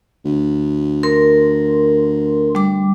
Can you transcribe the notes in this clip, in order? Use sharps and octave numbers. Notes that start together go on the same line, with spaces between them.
D2
A#4 C6
G3 D6